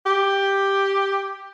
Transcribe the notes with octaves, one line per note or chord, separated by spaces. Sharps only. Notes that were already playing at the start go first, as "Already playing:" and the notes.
G4